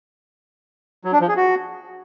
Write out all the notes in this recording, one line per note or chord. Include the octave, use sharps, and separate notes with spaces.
F#3
D4
F3
G#4
F#4